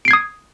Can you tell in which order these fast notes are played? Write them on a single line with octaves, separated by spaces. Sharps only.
D7 C7 G#6 D#6